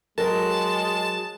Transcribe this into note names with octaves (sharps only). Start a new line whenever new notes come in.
F#3 G#3 A#4 A5